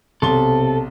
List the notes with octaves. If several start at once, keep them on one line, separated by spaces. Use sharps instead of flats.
B1 C3 A4 C6 G7